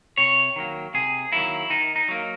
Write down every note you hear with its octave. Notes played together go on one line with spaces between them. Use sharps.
C3 C#5
D#3 F#3 A#3
C3 G#4
D#3 F#3 A#3 E4
D#3 D#4
D#4
F#3 A#3